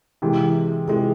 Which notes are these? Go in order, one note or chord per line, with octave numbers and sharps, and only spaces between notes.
C3 E3 G#3
C3 E3 G#3